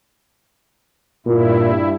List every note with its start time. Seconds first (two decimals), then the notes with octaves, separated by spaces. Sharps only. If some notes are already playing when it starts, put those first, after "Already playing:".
1.26 G2 A#2 E4